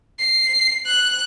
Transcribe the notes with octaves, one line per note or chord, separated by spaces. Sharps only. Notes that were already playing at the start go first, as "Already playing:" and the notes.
C7
F#6